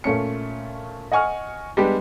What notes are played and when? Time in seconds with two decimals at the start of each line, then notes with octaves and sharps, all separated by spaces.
0.04 A#2 A3 C#4 C#7
1.12 D#5 F#5 G#5 C#6 F6
1.77 G3 G#3 B3 D4 G4